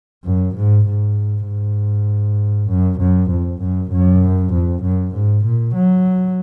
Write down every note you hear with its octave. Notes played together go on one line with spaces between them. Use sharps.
F#2
G#2
G#2
G#2
F#2
F#2
F2
F#2
F#2
F2
F#2
G#2
A#2
F#3